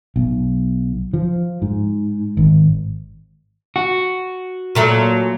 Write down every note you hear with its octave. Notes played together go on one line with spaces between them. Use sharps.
B1
F3
G#2
G#1
F#4
A#2 F#3 A3